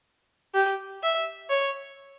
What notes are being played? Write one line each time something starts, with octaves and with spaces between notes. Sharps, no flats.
G4
E5
C#5